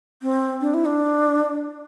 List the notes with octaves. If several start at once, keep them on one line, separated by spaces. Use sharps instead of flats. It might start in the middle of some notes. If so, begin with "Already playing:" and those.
C4
D4
E4
D4